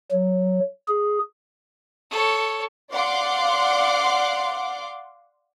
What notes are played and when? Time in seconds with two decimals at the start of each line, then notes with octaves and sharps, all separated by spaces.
0.12 F#3
0.88 G#4
2.10 A4 C#5
2.93 D5 F5 F#5 C6 D6